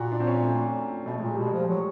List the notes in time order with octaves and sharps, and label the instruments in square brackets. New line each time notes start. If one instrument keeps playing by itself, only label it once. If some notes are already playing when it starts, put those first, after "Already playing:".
Already playing: [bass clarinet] A#2 [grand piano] F#4
[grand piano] D4
C4
C#4
A3
[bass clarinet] B2 [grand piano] A3
[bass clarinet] A#2 [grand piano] G#3
[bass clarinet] B2 [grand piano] G3
[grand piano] G#3
[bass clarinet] F3
F#3